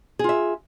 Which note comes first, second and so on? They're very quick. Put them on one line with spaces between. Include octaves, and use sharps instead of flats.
G#4 F4 E5